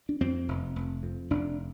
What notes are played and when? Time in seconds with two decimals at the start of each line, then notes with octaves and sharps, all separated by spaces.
0.09 D4
0.21 F2 C4
0.48 F1
0.76 F1
1.03 F2
1.30 F1 D4